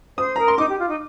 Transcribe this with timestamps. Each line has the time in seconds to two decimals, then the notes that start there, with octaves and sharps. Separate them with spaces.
0.18 C5 D#6
0.36 A#4 A#5
0.48 C6
0.58 D#4 D6
0.69 G4
0.79 F4
0.89 D#4